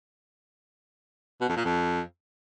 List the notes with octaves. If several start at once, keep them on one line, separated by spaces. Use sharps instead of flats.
B2
F2
A#2
F2